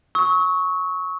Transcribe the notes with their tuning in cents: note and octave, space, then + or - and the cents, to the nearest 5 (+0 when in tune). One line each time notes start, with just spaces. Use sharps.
C#6 +0 E6 -45